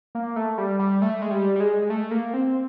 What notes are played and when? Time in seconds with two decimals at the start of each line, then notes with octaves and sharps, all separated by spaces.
0.15 A#3
0.36 A3
0.58 G3
0.79 G3
1.02 A3
1.22 G#3
1.31 G3
1.56 G3
1.60 G#3
1.82 G#3
1.90 A3
2.11 A#3
2.34 C4